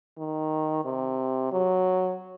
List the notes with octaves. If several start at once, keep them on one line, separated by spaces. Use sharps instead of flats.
D#3
C3
F#3